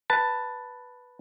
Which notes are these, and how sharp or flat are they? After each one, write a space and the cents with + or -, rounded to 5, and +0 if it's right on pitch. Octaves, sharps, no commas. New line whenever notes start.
B4 +0 A5 +10